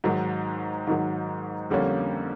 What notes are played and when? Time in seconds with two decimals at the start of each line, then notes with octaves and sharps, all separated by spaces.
0.04 G#2 D#3 F#3
0.87 G#2 D#3 F#3
1.70 F2 D3 G3 A#3 C#4